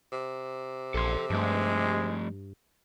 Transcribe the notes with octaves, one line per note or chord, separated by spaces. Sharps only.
C3
A#1 A4 C6
G2 F3 G#3 A3